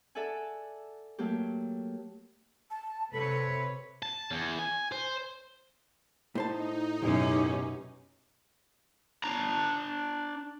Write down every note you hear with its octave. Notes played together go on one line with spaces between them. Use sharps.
A4 D5 E5 F#5 G#5
F#3 A3 A#3 G4
A5
C3 A4 B4 C#5
A5
E2
G#5
C5
A2 D#4 C5 A5
F#2 B2 C#4 G4
D4 A#5